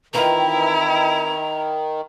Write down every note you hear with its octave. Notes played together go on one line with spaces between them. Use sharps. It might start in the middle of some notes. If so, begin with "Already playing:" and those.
D#3 E3 C4 E4 F4 A#5